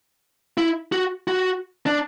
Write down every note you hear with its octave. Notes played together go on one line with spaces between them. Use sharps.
E4
F#4
F#4
D4